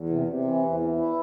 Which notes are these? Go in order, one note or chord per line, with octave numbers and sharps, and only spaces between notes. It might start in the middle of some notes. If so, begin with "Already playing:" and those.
Already playing: E2
C3
C3
E3
E2
E3
E4